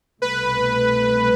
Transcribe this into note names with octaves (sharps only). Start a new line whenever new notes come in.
C2 B2 A3 B4